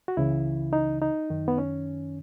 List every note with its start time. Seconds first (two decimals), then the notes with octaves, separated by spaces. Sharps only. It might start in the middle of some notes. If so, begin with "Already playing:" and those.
0.08 F#4
0.17 C#2 C#3 E3 E4
0.73 D#4
1.02 D#4
1.30 F#2 D#3
1.48 B3
1.58 C#4